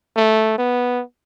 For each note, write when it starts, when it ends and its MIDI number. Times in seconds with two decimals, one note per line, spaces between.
0.16 0.55 57
0.58 1.02 59